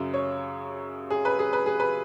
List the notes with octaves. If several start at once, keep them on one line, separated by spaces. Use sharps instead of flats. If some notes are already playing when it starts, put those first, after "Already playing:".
Already playing: F#2 C#3 F#3
C#5
G#4
B4
G#4
B4
G#4
B4